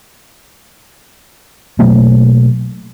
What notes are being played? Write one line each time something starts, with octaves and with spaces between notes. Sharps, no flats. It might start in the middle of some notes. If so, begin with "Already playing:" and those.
B2 F#3 A3 A#3